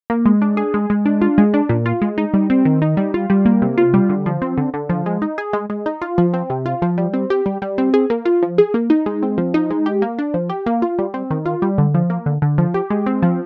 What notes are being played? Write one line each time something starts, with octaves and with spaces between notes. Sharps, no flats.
A#3
G#3
D4
G#4
G#3
G#3
D4
F4
G#3
D4
A#2
F4
G#3
D#4
G3
C4
D#3
D#4
G3
F4
G3
A#3
C3
F4
G3
D3
F3
C4
D3
D3
F3
G#3
D#4
G#4
G#3
G#3
D#4
F4
F3
C4
C3
F4
F3
G3
C4
G4
G3
G3
C4
G#4
A#3
F4
F3
G#4
A#3
D#4
G#3
C4
F3
D#4
G#3
G4
A#3
D4
F3
G4
A#3
F4
G3
C4
D#3
F4
G3
D3
F3
A#3
D3
D3
F3
G4
G#3
C4
F3